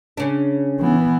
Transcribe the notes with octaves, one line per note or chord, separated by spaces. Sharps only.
C#3 D4
E3 B3